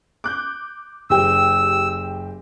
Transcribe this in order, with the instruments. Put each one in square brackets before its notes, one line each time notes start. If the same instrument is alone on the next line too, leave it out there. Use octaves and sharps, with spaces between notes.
[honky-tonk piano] D6 F#6 G6
[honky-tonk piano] F#1 G4 [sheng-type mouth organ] E6